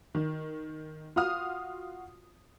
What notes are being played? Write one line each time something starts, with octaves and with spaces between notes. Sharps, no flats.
D#3
F4 F#4 F5 D#6 F6